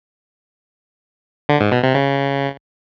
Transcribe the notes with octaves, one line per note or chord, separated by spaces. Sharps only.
D3
G#2
B2
C3
C#3